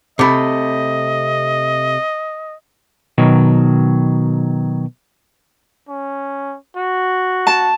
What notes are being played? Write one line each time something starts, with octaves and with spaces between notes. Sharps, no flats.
C3 A3 D#5 B5 D6
B2 D#3 F#3
C#4
F#4
A5